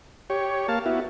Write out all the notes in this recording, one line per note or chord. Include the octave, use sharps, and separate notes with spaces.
G4 C#5
A#3 F5 A5
B3 E4 F#4